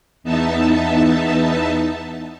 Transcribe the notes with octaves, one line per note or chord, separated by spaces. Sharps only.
E2 B3 D#4 E5 A5